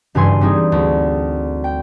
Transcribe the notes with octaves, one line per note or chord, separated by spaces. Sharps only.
F#1 G2 E3 G3 G#5 C6
G3 C4 D#4 G#4
D2
G5